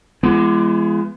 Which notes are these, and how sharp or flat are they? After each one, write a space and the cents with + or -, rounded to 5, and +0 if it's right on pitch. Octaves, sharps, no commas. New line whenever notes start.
E3 +45 G#3 +0 B3 +0